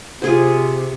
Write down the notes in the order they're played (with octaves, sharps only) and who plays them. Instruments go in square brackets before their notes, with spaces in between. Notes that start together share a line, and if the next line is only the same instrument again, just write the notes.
[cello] C3 [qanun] F4 G#4 C5